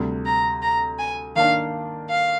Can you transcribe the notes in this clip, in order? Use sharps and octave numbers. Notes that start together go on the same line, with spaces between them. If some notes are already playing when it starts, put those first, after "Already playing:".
Already playing: D2 C3 G3
A#5
A#5
G#5
D#3 A#3 D4 F5
F5